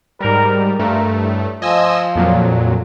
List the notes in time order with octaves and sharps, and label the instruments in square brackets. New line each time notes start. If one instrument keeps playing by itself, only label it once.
[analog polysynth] G#2 G3 [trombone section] A#4
[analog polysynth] G2 A3 [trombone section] A#2 A#4
[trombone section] A2
[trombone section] F3 [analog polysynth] D#5 G#5 E6
[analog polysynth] F2 A#2 F#3